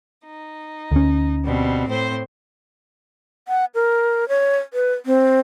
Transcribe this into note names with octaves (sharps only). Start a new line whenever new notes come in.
D#4
D2 C#4
B2 G3 C4
A2 C4 C5
F#5
A#4
C#5
B4
C4